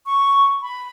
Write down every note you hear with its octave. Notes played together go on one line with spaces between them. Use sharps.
C#6
B5